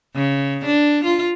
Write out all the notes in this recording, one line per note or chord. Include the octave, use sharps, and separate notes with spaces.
C#3
D4
F4